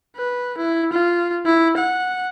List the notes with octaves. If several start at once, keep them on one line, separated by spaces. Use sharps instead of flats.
B4
E4
F4
E4
F#5